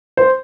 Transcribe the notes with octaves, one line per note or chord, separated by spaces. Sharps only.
C5